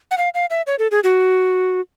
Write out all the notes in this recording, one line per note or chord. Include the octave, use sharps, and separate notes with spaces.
F#5
F5
F5
E5
C#5
A4
G#4
F#4